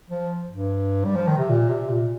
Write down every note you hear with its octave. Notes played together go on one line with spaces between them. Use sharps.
F3
G2
G3
F3
D#3
C3
A#2
C3
A#2